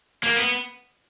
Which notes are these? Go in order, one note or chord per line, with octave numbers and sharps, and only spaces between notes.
A#3
B3